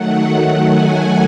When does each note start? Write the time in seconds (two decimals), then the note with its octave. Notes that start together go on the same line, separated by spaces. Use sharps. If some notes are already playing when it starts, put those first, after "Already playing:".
Already playing: D#3 F#3 A3 F#5
0.71 G#5